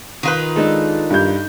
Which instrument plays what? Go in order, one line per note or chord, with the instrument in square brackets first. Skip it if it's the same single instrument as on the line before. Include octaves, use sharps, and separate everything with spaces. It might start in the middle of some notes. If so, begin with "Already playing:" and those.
[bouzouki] D#3 F4 B4
[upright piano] G#3 [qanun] D4 D#4 A4
[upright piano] G2 G3 G6